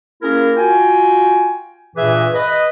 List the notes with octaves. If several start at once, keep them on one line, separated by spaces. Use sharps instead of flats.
A#3 C#4 E4 G#4 A#4
F4 F#4 G5 G#5
G2 A#2 E3 G#4 B4 E5
B4 D#5